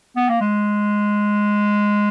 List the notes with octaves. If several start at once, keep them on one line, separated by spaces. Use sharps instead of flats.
B3
A#3
G#3